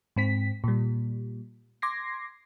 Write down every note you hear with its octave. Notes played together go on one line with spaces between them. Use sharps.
G#2 C4 B6
A#2 G3
C6 D6 G#6 A#6 C7